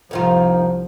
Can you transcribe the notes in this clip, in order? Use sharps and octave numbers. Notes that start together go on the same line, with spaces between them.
C2 F2 D#3 F3 F4